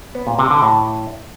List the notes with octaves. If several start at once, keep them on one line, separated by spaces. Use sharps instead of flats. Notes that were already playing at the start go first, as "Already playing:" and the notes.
B3
A#2
C3
D3
A2